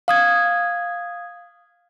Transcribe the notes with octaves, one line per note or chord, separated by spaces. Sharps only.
F5 D#6 G#6